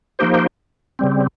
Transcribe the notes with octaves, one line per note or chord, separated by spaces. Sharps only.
F3 A#3 D#4 G4 C5
C#3 G3 C4